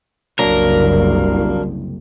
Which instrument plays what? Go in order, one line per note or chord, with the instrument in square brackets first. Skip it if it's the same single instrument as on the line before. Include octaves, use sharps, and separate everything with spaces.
[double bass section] F#1 C2 [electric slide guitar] F#3 A#3 D4 [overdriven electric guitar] A#4